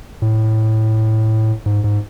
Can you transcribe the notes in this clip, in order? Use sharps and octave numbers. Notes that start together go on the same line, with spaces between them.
A2
G#2
G#2